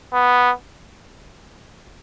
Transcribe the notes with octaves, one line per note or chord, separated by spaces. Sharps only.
B3